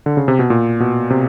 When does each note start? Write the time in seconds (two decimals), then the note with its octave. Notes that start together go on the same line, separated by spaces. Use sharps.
0.06 D3
0.17 C#3
0.28 C3
0.39 B2
0.50 A#2
0.80 B2
1.10 C3